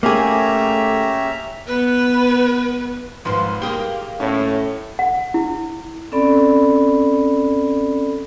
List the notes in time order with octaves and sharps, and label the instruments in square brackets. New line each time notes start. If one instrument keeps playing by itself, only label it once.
[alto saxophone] A3 [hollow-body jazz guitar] A#3 G#4 [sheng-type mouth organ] C#4 G4 [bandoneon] E5 A#5
[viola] B3 B4
[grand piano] G#1 B4 C6 [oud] F3 C5
[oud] A#3 G#4 [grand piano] G4 G7
[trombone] A2 [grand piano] C#4
[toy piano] F#5
E4
[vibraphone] C4 C#4 A4 D5 B5